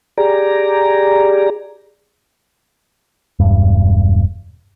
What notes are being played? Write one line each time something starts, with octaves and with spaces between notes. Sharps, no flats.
G4 G#4 D5 A#5
E1 G2